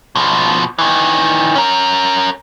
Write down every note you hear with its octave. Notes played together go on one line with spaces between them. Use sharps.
B2 F3
D#3 E3
C#4 A#4